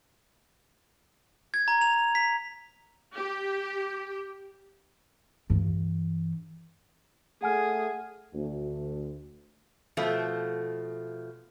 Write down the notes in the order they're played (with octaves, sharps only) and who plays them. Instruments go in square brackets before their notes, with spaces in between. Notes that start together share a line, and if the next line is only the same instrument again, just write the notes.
[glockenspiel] G#6
A#5
F7
B6
[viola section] G4
[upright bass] G2 E3
[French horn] A3 [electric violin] G#4 [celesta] F#5 G#5 F6
[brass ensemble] D2
[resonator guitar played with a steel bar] B2 F3 A3